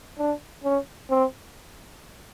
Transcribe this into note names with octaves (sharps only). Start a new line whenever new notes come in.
D4
C#4
C4